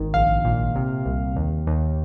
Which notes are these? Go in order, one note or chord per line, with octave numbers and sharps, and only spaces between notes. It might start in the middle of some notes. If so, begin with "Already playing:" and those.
Already playing: G#1 D#3
A#1 F5
A#2
C3
C2
D#2
D#2